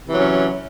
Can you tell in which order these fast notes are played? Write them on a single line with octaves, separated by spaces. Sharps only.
C3 E3 F#3 C#4